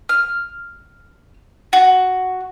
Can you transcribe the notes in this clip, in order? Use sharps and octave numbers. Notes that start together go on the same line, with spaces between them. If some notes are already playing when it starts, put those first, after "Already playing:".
F6
F#4